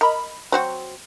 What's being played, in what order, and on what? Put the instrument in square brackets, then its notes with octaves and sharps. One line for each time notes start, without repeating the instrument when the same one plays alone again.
[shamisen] A#4 [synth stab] D#5 B5
[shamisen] F#3 C4 F#4